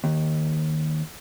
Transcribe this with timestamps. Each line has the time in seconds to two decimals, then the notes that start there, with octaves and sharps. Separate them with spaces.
0.04 D#2